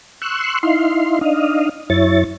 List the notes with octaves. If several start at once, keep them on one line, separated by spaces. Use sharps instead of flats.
C6 C#6 E6 F#6
D#4 E4 F5 C6
D4 D#4 D#5 F5
F#2 E4 C#5 A6